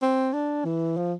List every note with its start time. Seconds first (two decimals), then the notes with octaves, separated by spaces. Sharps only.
0.02 C4
0.33 D4
0.65 E3
0.97 F3